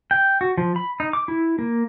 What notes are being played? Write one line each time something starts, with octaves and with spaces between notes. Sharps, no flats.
G5
F#4
F3
B5
D#4
D6
E4
A#3